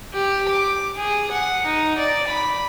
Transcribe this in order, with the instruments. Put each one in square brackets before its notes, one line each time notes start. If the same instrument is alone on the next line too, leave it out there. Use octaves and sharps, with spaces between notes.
[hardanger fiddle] G4
D6
G#4
F#5
D#4
D5
B5